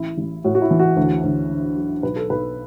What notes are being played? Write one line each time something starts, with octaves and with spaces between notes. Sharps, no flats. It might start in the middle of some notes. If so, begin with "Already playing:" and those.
Already playing: A1 E4
A1
A2 F#4
F#4
E4
E3
F#4
D2
D2
D3
F#3
B1 B4
A4
B1 B4